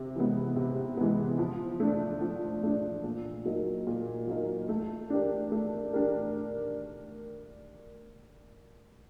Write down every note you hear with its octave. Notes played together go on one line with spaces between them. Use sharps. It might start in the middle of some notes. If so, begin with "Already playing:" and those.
Already playing: C3
E3 G#3 B3
C3
E3 G#3 B3
F3
A3 D4
F3
A3 D4
A#2
F#3 A#3 D#4
A#2
F#3 A#3 D#4
A3
D4 G4 A#4
A3
D4 G4 A#4